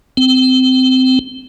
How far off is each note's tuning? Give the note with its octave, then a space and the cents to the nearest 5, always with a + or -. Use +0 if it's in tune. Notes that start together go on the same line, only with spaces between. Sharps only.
C4 -20